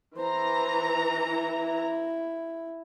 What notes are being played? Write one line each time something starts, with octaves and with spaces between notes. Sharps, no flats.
E3 C5 A#5
E4